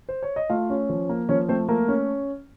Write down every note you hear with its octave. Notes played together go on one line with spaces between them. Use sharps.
C5
C#5
D#5
A3 F4 F5
C#4
F3
A#3
F3 C#4 C#5
A3 C4 C5
A3 A#3 A#4
C#4